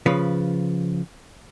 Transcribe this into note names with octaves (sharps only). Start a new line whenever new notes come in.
C#3 F3 B4